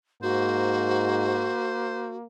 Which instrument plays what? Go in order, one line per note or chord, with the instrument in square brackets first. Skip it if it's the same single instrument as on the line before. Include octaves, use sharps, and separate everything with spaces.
[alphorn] G#2 [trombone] A#3 [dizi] F#4 [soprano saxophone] C5